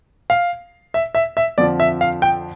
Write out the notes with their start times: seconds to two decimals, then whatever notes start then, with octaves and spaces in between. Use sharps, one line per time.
0.30 F5
0.94 E5
1.15 E5
1.37 E5
1.58 F2 D3 F3 D5
1.80 E5
2.01 F5
2.22 G5